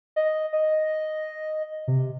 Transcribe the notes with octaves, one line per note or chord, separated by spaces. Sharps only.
D#5
D#5
C3